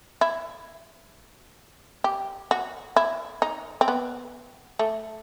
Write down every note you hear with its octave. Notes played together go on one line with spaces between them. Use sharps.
E4
G4
F#4
E4
D#4
C4
B3
A3